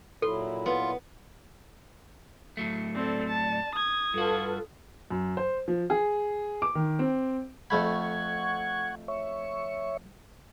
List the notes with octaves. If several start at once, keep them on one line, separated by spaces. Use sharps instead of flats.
A#2 F#3 E4 A4 C6
B3 F4
A2 F#3 A3
C4 A4 D5
A5
D#6 G#6
G2 F4 F#4 A4 B4
F#2
C5
F3
G#4
D6
D#3
C4
F2 A3 F#5 B5 C#6 G#6
C#5 E5 C#6